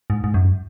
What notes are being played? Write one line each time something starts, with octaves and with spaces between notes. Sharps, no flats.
G#2
G#2
F#2